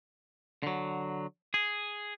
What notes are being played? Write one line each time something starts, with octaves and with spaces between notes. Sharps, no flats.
D3 F#3
G#4